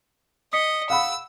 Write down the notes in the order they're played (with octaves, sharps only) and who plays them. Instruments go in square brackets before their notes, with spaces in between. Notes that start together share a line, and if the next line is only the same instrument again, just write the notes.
[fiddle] D#5 [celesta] D#6 B6 C#7
[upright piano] F5 F#5 B5 [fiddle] E6